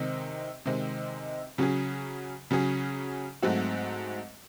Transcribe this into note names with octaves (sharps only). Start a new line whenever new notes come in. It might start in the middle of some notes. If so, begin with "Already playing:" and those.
Already playing: C3 D#3 G#3 C4 D#4
C3 D#3 G#3 C4 D#4
C#3 F#3 C#4 G#4
C#3 F#3 C#4 G#4
G#2 F#3 A3 C4 F#4